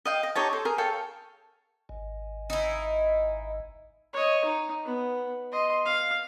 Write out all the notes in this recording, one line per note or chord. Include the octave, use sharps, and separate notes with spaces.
D#5 F5 G5
D#5
D#4 G4 C#5 A5
A4 C5
G#4 A#4
A4 C#5 F5 G5
G#1
D#4 E4
C#5 D#5
D#4
B3
D#5 C6
F5